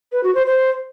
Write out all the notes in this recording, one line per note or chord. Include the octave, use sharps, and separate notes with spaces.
B4
F#4
C5
C5